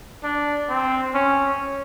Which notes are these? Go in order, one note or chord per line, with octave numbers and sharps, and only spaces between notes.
D4
C4
C#4